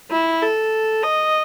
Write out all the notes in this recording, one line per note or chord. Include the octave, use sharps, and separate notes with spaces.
E4
A4
D#5